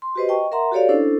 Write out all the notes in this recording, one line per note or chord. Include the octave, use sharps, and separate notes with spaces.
C6
F#4 G4 B4 C5 D#5
D#5 G5 A5 C#6
A#4 E5 F#5 A#5 C6
F#4 G4 A4 C#5 D5 F5
C#4 D4 E4 A4 C5